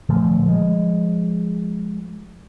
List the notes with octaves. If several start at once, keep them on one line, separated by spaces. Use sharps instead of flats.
A#2 D3 F3 A3
F3 G#3